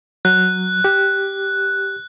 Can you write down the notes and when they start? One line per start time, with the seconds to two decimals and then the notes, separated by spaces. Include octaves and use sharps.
0.25 F#3 F#6
0.84 G4